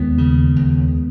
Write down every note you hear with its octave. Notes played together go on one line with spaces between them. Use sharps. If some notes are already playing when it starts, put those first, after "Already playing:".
Already playing: D#2 G#3 B3
C#3
D#2